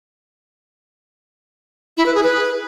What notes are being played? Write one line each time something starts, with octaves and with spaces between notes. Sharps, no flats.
E4
B4
G#4
B4